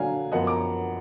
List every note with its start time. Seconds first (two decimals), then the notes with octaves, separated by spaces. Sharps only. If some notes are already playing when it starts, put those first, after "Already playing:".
Already playing: D3 F#3 D4 F5 G#5 A#5
0.32 F#2 F3 B3 D#5 F#5
0.47 A#5 D6